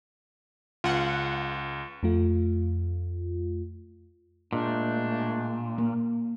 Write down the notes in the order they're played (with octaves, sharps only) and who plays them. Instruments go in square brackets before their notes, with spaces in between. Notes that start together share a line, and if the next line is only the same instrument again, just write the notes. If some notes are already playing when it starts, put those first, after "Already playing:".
[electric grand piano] C#2 [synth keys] F4 F#5
[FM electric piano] F2 A3 F4
[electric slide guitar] A#2 [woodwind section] G#3 A3 D4
[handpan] A#3